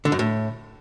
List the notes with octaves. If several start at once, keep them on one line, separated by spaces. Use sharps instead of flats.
D3
F#2
A2